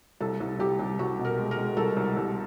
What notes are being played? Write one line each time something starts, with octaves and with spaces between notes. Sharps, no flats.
C2 A4
C2
C2 G4
C2
C2 F#4
B2
A#4
G#3
A#4
G#3
C2 A4
C2
C2